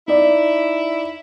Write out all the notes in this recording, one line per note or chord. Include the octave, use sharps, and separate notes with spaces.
D#4 E4 D5 E5